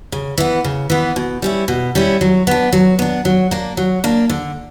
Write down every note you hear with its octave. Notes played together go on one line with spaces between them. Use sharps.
C#3
E3 B3
C#3
E3 B3
B2
G3 C#4 E4
B2
G3 C#4 E4
F#3
B3 D4
F#3
B3 D4
F#3
A#3 D4
F#3
A#3 D4
D3